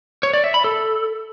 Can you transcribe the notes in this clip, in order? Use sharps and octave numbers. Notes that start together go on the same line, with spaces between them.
C#5
D5
E5
B5
A4